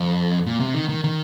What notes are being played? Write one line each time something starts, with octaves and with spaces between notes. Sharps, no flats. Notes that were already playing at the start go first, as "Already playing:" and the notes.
Already playing: F2
A#2
C3
D#3
D#3
D#3